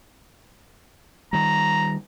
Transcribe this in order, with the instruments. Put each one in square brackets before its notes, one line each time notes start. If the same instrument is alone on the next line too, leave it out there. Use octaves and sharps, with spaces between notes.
[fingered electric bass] D#3 G3 [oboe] A#5